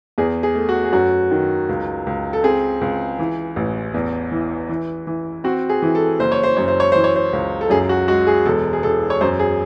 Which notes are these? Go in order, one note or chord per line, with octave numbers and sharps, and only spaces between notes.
E2 G#4
G#4
A3
F#4
G#4
F#2 F#4
D#3
C#2
C#2
A4
C4 G#4
C#2
E3
A1
E2
E3
E3
E3
C4 F#4
G#4
E3
A4
F#1 C5
C#5
C5
F#2 C#5
C5
C#5
E3 C5
C#5
C5
C#2
A4
F#2 G#4
F#4
G#3 F#4
G#4
E1 A4
G#4
E1 A4
C#5
F#2 C5
G#4